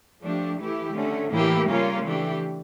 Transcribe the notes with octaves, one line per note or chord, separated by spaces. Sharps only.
F3 A3 D4 G4
E3 A3 E4 G4
D3 A3 C#4
A2 E3 A#3 E4 G4
C#3 G3 A#3 C#4 F4
E3 A3 D4 G4